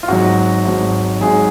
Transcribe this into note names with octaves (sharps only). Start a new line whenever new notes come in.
F4
G#1 G#2 F#3 F#4
G#1 G#2 F#3
G#1 G#2 F#3 G#4